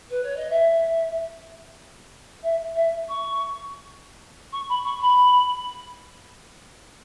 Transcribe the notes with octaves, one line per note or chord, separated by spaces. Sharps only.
B4
C#5
D#5
E5
E5
E5
C#6
C#6
B5
C#6
B5